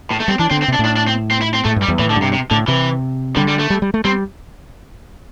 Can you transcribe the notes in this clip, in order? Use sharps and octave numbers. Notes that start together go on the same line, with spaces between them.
A2
A3
G3 C4
E3 D4
D3 C4
C4
C3
D4
A2
D4
D4
C4
C4
E4
C4
A2 A3
G2
G3
E2
A2 E3
D3
G2
C3
C3
A2 D3
C3 E3
D3 G3
G3
A3
G3
G3
A3
G3 C4